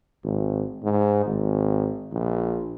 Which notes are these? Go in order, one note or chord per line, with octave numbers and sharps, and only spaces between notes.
G#1
G#2
G#1
A#1